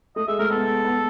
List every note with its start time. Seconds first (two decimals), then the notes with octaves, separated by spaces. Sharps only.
0.16 A3 D#5
0.28 G#3 E5
0.39 A3 A#4
0.51 B3 A4
0.85 B3